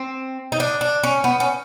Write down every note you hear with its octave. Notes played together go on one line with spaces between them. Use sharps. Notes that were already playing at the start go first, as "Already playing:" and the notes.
Already playing: C4
D#4
D4
D4
C#4
B3
C#4